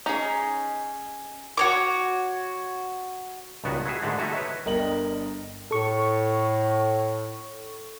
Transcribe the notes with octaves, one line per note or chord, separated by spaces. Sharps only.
C#4 D#4 G#4
F#4 C#5 D6
C#2 G2 D#3 B3 F#4
E4 F#4 G#4 E5
G#2 D3 D#3 G#3 A3
G3 A3 D#4 E4 F#4
B4 C#5 E5
G1 D3 A#4 D#5 G5 F#7
A2 A4 C#6